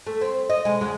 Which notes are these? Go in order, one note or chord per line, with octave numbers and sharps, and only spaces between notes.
A3
C4
D#5
B2 G#3
E2 C#3 G#3